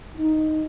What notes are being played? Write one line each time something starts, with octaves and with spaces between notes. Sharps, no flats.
D#4